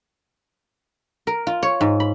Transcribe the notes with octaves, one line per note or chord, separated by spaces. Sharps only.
A#4
F4
C#5
G#2
B5